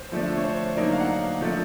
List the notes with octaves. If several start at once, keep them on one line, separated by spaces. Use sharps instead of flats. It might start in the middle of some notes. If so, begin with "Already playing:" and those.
Already playing: C5
D3 F3 A3 D4
C#5
C5
D3 F#3 A#3 D#4 D5
F5
F#5
F3 A3 D4